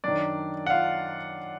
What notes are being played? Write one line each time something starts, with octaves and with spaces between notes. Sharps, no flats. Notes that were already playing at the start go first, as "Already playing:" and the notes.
F#2 D#3 D4 D5
F#5
F4 F5